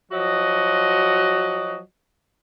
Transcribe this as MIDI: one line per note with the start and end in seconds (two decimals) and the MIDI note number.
0.11 1.78 53
0.11 1.78 54
0.11 1.78 66
0.11 1.78 75